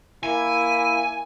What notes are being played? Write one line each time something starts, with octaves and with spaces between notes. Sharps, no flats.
A#3 E4 G#5